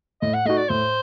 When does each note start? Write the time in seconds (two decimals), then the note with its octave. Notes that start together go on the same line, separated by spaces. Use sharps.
0.22 A2 D#5
0.34 F#5
0.45 A3 D#4 F#4 D#5
0.58 D5
0.69 A2 C5